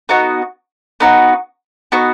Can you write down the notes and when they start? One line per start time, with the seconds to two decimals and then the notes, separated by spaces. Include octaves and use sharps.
0.09 B3 D#4 F#4
1.00 B3 D#4 F#4
1.92 B3 D#4 F#4